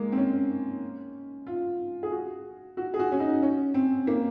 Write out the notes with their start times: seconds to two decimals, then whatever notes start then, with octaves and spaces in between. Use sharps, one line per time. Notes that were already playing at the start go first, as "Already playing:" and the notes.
Already playing: G#3 A#3
0.12 C4
0.17 C#4
1.47 F4
2.03 G#4
2.12 F#4
2.77 F#4
2.94 G#4
2.99 F#4
3.12 C#4
3.20 D#4
3.42 C#4
3.74 C4
4.07 A#3